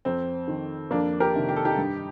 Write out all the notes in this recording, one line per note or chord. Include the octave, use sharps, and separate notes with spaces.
F2 C4
D#3
F2 A#3 D4
G4 A#4
C3 D#3
G4
A4
D#4 G4
G2